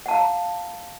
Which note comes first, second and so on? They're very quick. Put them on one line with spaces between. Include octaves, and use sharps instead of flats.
F#5 A5 F5 A#5